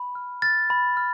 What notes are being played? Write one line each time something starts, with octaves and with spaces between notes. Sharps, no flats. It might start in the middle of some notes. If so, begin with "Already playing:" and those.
Already playing: B5
F6
F6 A6
B5
F6